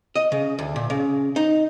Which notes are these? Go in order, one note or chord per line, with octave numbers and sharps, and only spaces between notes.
D#5
C#3
D2
A#2
C#3
D#4